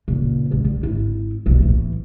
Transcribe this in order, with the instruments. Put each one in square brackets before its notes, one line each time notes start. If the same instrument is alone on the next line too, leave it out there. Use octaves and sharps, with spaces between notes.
[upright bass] A#2 C#3
A1 F2
D3 D#3
G#1 E4
D#1 B1
A2 E3